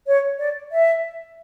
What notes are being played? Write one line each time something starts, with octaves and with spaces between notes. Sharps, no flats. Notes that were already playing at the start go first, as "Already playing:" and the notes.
C#5
D5
E5